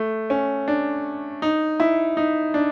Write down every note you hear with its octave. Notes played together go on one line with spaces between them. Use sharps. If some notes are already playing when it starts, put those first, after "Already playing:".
Already playing: A3
C#4
D4
D#4
E4
D#4
D4